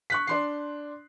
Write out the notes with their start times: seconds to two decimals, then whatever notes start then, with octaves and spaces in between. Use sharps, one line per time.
0.10 C#6 F#6 B6
0.27 D4 C6 C7